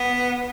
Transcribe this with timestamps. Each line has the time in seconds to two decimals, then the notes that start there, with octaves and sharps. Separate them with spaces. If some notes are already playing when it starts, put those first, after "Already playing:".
Already playing: B3